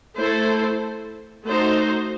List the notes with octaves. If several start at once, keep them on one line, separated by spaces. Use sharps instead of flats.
A3 E4 A4 C5
A3 D#4 F#4 C5